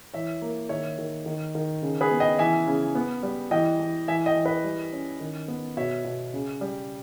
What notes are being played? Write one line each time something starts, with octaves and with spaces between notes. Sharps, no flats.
E3 C#5 E5
A#3
D#3 C#5 E5
D#3
D#3
D#3
C#3
G#4 B4
B3
D#5 G5
E3 E5 G#5
C#3
B3
G3
E3 D#5 G5
E3
E3 E5 G#5
D#5 G5
E3
B4 D#5
G3
C#4
D#3
B3
B2 C#5 E5
B2
C#3
G3